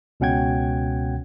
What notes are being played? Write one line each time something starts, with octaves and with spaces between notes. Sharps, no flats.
C#2 B2 C#4 F#5 G5 G#6